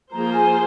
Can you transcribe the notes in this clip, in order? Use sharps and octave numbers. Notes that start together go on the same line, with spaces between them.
F3 A#3 F4 G#4 C5 A#5
G#5